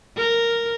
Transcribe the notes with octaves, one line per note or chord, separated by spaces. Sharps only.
A#4